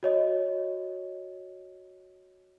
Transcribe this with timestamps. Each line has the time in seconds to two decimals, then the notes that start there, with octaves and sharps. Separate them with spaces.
0.03 F#4 C#5 D#5